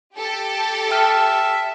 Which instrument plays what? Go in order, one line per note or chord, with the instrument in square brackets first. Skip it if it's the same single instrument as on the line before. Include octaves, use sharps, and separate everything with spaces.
[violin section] G4 A4
[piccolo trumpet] E5 [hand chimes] G5 A5 F6